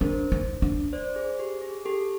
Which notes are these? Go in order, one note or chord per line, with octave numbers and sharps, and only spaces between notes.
D4 A#4 C5
D#4
D4
C5 D5
G#4
G4
G#4
G4 A4